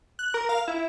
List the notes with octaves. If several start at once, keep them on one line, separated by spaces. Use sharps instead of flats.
F#6
A#4
F5
E4